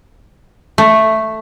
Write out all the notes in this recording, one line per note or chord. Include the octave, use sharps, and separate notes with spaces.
A3